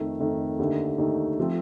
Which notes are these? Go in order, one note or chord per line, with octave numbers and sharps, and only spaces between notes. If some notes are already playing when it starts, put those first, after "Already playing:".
Already playing: F2 D#3 A3
F2 D#3 A3
D#2 D3 A3 D#4
D#2 D3 A3 D#4
F3 A3 C4